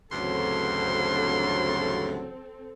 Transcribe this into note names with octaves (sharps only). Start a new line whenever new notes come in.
D2 G2 C#3 E3 F#3 C4 A4 C6